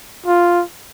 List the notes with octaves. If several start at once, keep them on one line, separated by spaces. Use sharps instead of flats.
F4